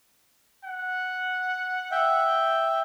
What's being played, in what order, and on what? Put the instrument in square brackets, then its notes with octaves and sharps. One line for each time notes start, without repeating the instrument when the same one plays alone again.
[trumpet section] F#5
[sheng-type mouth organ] E5 G5